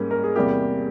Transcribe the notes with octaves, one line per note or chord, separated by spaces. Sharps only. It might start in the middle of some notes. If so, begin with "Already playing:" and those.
Already playing: G#2 G3 A#3 C#4
A#4
G#4
E2 C3 G3 A#3 G4